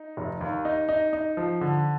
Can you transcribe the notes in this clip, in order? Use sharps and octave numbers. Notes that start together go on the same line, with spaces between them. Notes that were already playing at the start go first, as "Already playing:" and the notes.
Already playing: D#4
F1
D#2
D#4
D#4
D#4
F3
D3